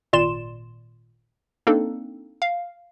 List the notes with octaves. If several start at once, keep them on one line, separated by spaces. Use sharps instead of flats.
G#1 A#2 D5 C6 E7
A#3 C4 D4 D#4 A4
F5